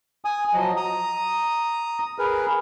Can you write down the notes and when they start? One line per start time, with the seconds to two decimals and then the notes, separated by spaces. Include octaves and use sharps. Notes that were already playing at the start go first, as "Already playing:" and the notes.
0.25 G#5 D#6
0.54 F3 F#3 D#5
0.77 A#5 D#6
2.19 G#4 A#4 B4